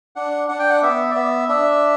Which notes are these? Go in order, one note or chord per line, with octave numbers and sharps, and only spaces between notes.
D4 F#5
D4 F#5
G5
F#5
B3 E5
D5
B3 E5
D4 E5